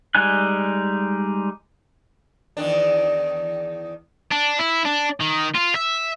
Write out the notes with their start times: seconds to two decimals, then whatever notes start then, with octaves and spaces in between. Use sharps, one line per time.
0.15 G3 G#3 D#4 G#5 F#6
2.57 E2 D#3 D4
4.32 D4
4.59 E4
4.85 D4
5.20 D#3
5.55 F4
5.75 E5